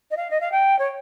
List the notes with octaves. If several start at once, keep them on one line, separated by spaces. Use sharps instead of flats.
D#5
F5
D#5
F5
G5
C#5